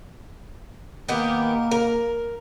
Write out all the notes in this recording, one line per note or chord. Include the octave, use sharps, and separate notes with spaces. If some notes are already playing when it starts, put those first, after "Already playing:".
D#3 A#3 B3 G4
A#4